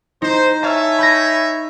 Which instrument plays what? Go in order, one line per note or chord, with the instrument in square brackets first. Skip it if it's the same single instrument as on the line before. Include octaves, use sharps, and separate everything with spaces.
[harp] D#4 [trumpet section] C5
[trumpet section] C#5 E5 G#5 [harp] A5 F6
[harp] B5 G6 A#6